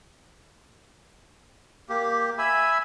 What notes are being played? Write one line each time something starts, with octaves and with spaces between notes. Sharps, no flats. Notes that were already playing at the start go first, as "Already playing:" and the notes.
A#3 G4
E5 G#5 B5